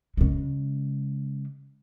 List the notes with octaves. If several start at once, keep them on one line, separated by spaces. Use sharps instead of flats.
C#3 G#3